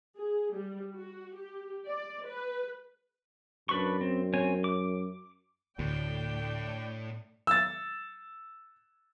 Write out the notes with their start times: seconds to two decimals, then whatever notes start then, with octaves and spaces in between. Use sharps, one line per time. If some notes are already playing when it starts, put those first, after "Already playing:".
0.17 G#4
0.54 G3
0.96 F#4
1.37 G4
1.86 D5
2.26 B4
3.69 F#2 D4 B4 C#6
4.01 C4
4.34 C4 C#5 G#5
4.64 D6
5.79 D2 A2 D4 G5
7.47 E6 A6